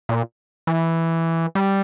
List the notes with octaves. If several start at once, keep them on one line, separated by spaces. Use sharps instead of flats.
A#2
E3
G3